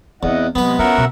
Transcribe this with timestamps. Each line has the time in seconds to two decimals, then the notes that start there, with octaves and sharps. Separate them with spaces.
0.23 E2 B3 C4 E4 D#5 F#5
0.55 C3 F#3 G#3 B3 B4
0.79 C#4 F4 F#4 A#4 E5 F#5
0.98 B2 A#3